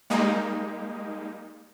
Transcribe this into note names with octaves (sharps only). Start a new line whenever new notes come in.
G3 G#3 A#3 D#4